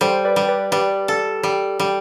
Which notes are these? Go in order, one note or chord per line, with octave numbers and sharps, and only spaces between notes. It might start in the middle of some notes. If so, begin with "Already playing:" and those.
G3 A4 C5
B4 D5
G3
B4 D5
G3 B4 D5
A4
G3
G3